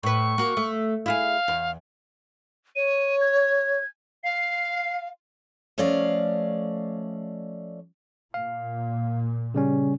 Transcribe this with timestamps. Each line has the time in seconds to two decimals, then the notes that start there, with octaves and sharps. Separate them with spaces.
0.03 A2 B4 C#6
0.38 A#3 F#4
0.57 A3
1.06 E4 F4 G#4 F5
1.48 E2
2.75 C#5 D#7
3.20 G#6
4.24 F5 C7
5.78 F3 A3 C#4 D5 D#5 F5
8.34 A#2 F5
9.54 C#3 G3 C#4